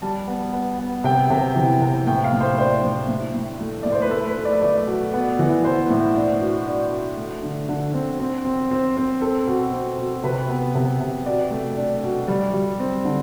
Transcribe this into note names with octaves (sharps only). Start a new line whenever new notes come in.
G3 A5
B3
B3
B3
C3 G5
C3
E3
C3
A2 G5
F5
A2
C5
D4 C5
A2
A2
A2
A3
A2 D5
C5
B4
A3 A4
B4
A3
D5
A3 D5
B2
B3
E3
B3 C5
A2
D4
B2
D4
B2
A3
D3
D3
C4
C4
C4
C4
C4
C4 A4
B2
C4
B2
C3 B4
B3
C3
C3
B2 D5
A3
D4
B2
G3
G3
C4
D3